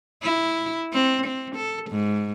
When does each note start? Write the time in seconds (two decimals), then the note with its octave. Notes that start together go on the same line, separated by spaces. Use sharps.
0.23 E4
0.93 C4
1.26 C4
1.56 A4
1.91 G#2